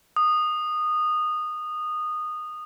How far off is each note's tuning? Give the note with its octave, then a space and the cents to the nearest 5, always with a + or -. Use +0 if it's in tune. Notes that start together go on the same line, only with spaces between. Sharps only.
D#6 -15